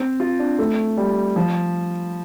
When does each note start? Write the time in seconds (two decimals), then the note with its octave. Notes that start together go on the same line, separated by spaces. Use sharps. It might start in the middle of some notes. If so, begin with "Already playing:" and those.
Already playing: C4
0.20 F4
0.39 D4
0.59 A3
0.97 G3
1.36 F3